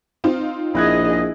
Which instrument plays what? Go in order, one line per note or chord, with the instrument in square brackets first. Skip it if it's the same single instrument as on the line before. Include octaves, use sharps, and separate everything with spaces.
[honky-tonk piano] C4 D#4 F4
[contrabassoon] A#1 [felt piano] E4 F#6 G#6 [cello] G#4 D#5